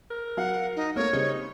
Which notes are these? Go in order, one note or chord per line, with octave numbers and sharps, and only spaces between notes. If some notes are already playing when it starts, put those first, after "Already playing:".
A#4
F#3 F5 F#5
D#4
A3 A#3 A#4 C#5
C#3 G3 C4 D#4